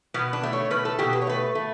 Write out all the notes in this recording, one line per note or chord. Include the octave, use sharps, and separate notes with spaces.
B2 B3
D4
A3
C#5
B2 B4
A4
B2 G4
B4
C#5
A3 B4
A3